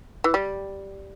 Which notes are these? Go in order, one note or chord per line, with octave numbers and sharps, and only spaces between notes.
E3
G3